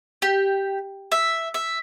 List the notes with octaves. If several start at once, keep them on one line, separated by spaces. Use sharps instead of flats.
G4
E5
E5